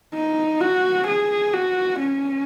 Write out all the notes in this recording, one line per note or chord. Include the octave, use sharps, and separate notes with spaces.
D#4
F#4
G#4
F#4
C#4